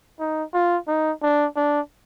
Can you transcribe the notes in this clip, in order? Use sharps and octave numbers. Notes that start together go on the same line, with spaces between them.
D#4
F4
D#4
D4
D4